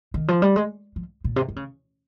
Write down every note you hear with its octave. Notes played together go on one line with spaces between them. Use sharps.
D#3
F3
G3
G#3
F3
A#2
C3
D#3
C#3